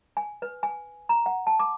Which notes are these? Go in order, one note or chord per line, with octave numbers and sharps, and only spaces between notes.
G#5
B4
G#5
A#5
F#5
A5
D6